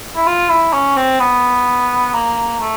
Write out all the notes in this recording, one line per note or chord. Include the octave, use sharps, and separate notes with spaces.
E4
F4
E4
C#4
C4
B3
A#3
A3